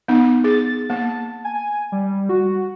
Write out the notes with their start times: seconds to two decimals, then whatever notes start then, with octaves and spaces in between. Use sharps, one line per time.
0.08 B3 D#4
0.44 G#4 A6
0.90 A#3 A5
1.44 G#5
1.92 G3
2.29 F#4